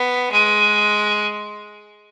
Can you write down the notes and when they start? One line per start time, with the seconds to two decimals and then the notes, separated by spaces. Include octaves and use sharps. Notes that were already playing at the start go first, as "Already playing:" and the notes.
Already playing: B3
0.32 G#3